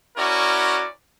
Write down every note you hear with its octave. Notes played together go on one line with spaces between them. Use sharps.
C#4 E4 F#4 A#4 D5